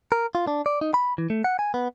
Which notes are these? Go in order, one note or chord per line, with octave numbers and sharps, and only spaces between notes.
A#4
F4
D4
D5
D#4
B5
E3
A3
F#5
G#5
B3